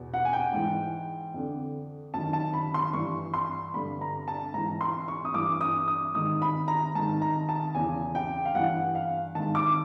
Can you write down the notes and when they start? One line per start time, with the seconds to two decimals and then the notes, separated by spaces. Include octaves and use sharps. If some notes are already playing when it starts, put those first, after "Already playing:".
Already playing: E2 B2
0.14 F#5
0.25 G#5
0.33 G5
0.53 G#2 E3
1.34 F2 D3
2.14 F#2 D#3 A5
2.33 A5
2.54 B5
2.74 C6
2.93 G2 E3 C#6
3.34 C6
3.74 G2 D3 B5
4.01 A#5
4.28 A5
4.54 G#2 E3 A#5
4.81 C6
5.08 C#6
5.25 D#6
5.34 G2 E3 D6
5.61 D#6
5.88 D#6
6.15 G#2 D#3 D#6
6.42 B5
6.68 A#5
6.95 G#2 D#3 A5
7.22 A#5
7.49 A5
7.75 E2 C#3 E3 G#5
8.15 G5
8.45 F5
8.55 G2 E3 F#5
8.95 F5
9.35 G#2 D#3 A5
9.55 D6